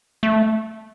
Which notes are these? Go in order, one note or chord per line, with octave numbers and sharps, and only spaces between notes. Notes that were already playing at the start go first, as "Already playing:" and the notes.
A3